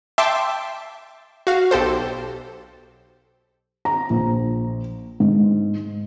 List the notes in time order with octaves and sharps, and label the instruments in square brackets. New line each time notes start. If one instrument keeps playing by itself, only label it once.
[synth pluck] E5 G5 A5 C6 D6
F#4 F5
B1 G4 A4 C5
[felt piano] A#5
A#1
G#2